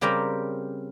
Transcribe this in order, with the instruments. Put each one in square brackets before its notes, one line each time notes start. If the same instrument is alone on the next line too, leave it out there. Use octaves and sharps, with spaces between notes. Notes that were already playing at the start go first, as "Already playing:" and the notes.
[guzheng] C#3 G3 C4 G4 A#4